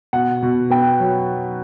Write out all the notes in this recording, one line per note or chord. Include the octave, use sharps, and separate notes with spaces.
B2 F#5
B2
B3 G5
F#3